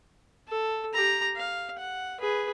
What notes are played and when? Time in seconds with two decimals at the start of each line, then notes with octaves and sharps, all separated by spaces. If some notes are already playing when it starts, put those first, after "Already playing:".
0.48 A4
0.94 G4 A#5
1.36 F5
1.79 F#5
2.20 G#4 B4